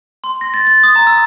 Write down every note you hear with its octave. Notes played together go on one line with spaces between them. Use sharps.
C6
A#6
A6
A6
D#6
A#5
E6